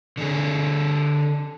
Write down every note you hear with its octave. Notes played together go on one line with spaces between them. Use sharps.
D3 G#4